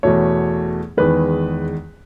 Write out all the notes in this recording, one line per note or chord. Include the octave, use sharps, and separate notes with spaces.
E2 B2 A3 C#5
E2 D#3 G#3 B4